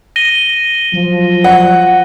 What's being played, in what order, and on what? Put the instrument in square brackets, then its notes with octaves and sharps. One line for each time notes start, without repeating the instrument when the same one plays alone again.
[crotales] A#6 D#7 G7
[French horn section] F3 [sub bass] F#3
[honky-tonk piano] F#5